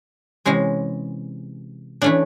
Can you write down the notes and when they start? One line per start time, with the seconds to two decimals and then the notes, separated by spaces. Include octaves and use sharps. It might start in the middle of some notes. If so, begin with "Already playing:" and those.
0.46 C3 E3 G#3 C#4
2.02 E3 A3 C#4 D4